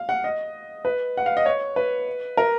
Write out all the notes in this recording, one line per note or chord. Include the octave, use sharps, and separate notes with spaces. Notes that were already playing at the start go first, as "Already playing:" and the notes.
Already playing: F5
F#5
D#5
B4
F#5
F5
D#5
C#5
B4
A#4